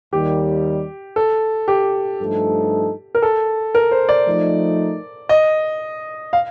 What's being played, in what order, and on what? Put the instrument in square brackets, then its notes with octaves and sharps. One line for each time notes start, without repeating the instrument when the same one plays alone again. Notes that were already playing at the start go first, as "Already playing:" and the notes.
[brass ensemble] D#2 D#3 G3 [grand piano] G4
[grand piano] A4
G4
[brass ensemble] G2 F3 A3 D#4 A4
[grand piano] A#4
A4
A#4
C5
D5
[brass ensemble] F3 A3 D#4
[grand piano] D#5
F5